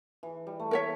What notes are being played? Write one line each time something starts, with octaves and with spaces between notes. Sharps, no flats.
E3
G3
A3
A#4 C#5 E5